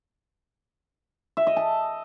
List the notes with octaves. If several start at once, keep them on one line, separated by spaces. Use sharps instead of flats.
E5
D#5
A5